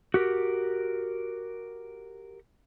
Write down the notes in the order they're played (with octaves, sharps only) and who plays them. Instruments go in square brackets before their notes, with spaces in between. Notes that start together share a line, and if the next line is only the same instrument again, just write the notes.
[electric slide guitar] F#4 G4 A#4